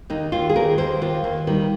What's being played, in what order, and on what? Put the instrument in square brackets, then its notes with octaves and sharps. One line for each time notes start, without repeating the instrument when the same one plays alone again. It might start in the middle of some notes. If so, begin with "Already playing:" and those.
[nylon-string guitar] D#2 D#4
D#2 F4
G#4
D#2 A#4
D#2 C5
D#2 F4
D#2
D#3 G3